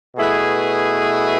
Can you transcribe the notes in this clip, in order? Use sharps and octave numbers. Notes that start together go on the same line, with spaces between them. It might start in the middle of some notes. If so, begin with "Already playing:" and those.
B2 A3 E4 G#4 B4